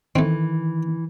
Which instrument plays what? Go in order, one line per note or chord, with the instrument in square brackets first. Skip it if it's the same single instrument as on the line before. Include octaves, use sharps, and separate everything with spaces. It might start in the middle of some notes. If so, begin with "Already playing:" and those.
[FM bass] D#3 [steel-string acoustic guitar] E3 [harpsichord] A3 C4